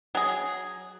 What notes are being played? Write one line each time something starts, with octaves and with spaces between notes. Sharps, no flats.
F#3 G#4